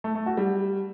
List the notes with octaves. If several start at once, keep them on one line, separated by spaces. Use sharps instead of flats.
A3
A3
F#4
G3